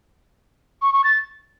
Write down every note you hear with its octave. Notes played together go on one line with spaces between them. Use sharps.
C#6
C#6
A6